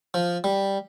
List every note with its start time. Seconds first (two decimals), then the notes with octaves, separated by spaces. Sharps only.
0.14 F3
0.44 G3